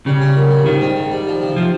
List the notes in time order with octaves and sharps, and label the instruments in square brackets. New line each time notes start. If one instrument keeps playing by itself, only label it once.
[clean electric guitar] C#3 [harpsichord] G3
[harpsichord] C#4
A#2
G3
[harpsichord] G#2 [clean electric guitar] D#3
[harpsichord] C4
G#2
G3
F3
C3
[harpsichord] C3 [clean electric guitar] F3